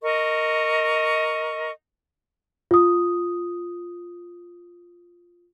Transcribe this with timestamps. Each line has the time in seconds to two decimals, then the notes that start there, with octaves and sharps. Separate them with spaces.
0.02 A#4 D#5 C#6
2.71 F4 D#6